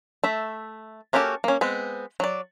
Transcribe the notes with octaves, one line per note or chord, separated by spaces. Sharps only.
A3 E5
A#3 C#4 F#4 G4 A4
A#3 C#4
G#3 B3 C4
F#3 D5